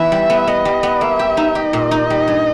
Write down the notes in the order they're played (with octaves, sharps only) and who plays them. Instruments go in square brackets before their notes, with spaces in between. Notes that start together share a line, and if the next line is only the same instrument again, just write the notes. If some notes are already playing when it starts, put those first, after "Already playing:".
Already playing: [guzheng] E3 B3 [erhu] E5
[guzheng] G3
B3
[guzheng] B3 [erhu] D#5
[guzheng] G3
B3
[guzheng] A#3 [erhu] E5
[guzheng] G4
D#4
[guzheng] G4 [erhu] D#5
[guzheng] A#2
D#4
G3
G2